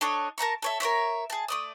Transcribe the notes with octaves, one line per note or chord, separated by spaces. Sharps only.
D4 A4 C#5 D#5
A#4 A5 A#5 C#6
A4 C#5 E5
A#4 C5 C#5 E5
G#4 A5
A3 D5 D#6